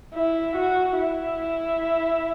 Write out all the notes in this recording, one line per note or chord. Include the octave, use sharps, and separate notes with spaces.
E4
F#4
E4